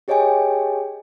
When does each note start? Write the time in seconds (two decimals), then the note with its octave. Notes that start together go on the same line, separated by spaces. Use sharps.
0.08 G4 G#4 C#5 D#5 G5 G#5